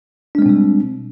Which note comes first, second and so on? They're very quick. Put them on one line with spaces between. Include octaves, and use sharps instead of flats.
D4 G#3 C4 B2 G3